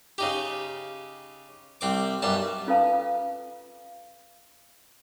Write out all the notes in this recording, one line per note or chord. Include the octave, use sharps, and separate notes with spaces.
C#3 D#4 G4
C2 C4 D6
B1 F#2 G3 A5
C#4 F4 A4 B4 F5 A5